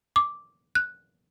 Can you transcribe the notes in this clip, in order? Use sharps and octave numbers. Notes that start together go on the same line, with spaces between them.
D6
F#6